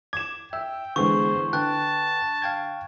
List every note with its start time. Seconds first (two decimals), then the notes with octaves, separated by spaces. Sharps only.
0.13 D6 G#6 E7
0.53 E5 G5 E6
0.96 D3 E3 G#3 B3 G#4 B4 C5 C#6
1.53 D3 B4 G5 A5 F#6
2.42 F5 G5 G#6